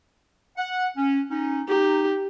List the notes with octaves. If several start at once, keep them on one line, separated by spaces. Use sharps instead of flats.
F#5
C#4
C#4 D#4
D#4 G4